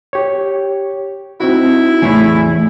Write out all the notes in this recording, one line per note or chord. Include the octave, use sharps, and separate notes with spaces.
G4 C#5
C4 D#4 E4 F#4
E2 A2 E3 G#5 B5